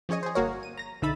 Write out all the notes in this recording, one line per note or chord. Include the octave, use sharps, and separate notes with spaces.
F3 C#4 G#4 C#5 D#5
G#4 C5
G1 A#3 F#4 A#4 C#5
D#7
A#5 A#6
B1 D3 D#4 E5 B5 A6